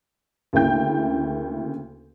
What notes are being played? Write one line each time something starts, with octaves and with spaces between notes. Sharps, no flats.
D2 C#3 A#3 E4 G5 G6